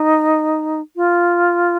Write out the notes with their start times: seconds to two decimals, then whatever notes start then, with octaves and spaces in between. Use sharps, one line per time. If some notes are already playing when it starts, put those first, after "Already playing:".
Already playing: D#4
0.96 F4